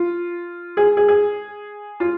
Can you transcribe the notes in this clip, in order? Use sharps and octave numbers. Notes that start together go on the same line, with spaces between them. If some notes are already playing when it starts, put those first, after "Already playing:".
Already playing: F4
G#4
G#4
G#4
F4